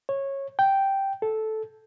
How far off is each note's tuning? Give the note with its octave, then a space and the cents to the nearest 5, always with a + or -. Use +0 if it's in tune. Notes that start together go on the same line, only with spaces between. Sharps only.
C#5 -15
G5 -5
A4 -10